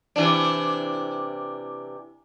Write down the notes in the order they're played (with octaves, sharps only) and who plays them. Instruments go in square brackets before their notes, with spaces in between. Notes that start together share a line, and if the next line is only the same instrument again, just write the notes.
[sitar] C3 E3 D4